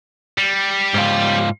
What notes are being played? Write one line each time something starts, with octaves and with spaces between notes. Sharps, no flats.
G3
G#2 F4